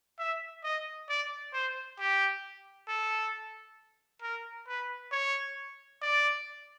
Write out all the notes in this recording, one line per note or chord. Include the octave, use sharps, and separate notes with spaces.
E5
D#5
D5
C5
G4
A4
A#4
B4
C#5
D5